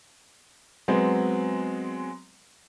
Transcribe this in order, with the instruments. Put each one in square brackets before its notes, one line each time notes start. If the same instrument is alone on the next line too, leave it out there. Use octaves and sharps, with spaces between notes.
[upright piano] F#3 G#3 B3 C4